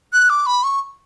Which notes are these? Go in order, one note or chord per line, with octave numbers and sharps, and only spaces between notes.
F#6
D6
B5
C#6